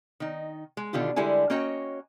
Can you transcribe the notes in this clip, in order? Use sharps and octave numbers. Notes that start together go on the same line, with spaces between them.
D#3 D#4
G#3
B2 D3 D#3 F4 G4
D3 G3 G#3 E4 A4 G#5
A#3 C#4 F#4 C#5 D#5 G5